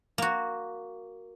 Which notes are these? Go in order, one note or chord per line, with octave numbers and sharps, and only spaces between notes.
A#3 F#4